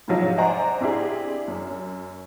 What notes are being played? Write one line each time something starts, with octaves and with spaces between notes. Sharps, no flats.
G#2 C3 F3 F#3 D#4
C5 D5 D#5 F#5 G#5 A#5
C4 D4 E4 G4 G#4
F#2